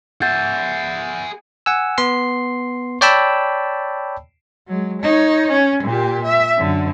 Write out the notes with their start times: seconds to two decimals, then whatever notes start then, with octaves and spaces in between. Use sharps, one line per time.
0.22 G#4 E5 F#5 G6 A6
1.66 F#5 G#5 E6
1.98 B3 C6 C7
3.01 C#5 D5 G5 A5 B5 E6
4.67 F#3 G#3
5.02 D#4 C#5
5.53 C#4
5.84 A#2 G4
6.26 E5
6.57 F#2 D3